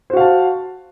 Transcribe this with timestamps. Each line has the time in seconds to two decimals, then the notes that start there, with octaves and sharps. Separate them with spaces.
0.10 C5
0.13 F#4
0.17 F5
0.20 A5